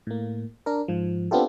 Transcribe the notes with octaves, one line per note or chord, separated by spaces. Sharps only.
A2 A#3
D4 A#4
G#2 F3
B3 C4 D4 F4 G4 A4